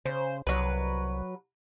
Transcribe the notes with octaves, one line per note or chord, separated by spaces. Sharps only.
C#3 C5
C2 F#3 B4